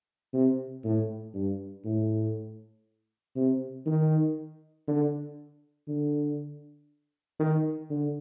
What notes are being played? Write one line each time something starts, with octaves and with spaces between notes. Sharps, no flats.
C3
A2
G2
A2
C3
D#3
D3
D3
D#3
D3